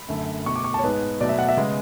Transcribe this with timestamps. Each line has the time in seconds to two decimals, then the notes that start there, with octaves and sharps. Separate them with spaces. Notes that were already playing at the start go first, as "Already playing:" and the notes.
Already playing: B5
0.08 F#2 D3 A3
0.46 B2 A3 C#6
0.56 D6
0.64 C#6
0.74 A5
0.79 C#5
0.84 G#2 G#3 B3 B4
1.21 B2 F#3 A3 D5
1.29 E5
1.39 F#5
1.49 E5
1.57 C#3 G#3 B3